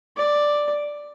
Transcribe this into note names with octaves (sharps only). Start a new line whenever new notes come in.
D5